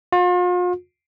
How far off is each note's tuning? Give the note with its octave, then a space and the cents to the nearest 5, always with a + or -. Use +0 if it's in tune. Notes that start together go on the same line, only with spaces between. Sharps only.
F4 +40